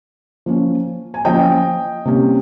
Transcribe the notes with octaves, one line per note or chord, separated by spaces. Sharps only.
F3 A#3 C#4
G#5
F3 A#3 C#4 D#5 G5
C3 G3 A#3 C#4